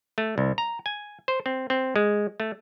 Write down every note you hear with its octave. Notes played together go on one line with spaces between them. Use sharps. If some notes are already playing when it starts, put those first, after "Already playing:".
A3
C2
A#5
G#5
C5
C4
C4
G#3
A3